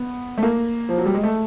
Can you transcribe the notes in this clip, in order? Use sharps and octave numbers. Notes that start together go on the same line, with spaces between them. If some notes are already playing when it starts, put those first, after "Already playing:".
Already playing: B3
A3
A#3
F3
F#3
G3
G#3
A3